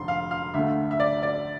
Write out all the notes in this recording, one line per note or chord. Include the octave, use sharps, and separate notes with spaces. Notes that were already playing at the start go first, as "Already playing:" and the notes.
Already playing: F1 F2 D3 F3 C6
F5
F5
D2 D3 A3 E5
E5
D5
D5